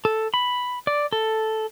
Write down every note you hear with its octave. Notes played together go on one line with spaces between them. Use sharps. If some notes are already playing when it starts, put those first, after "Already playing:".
A4
B5
D5
A4